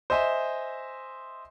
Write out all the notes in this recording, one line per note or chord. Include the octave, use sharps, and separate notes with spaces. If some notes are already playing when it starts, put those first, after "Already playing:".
C5 D#5 E5 G#5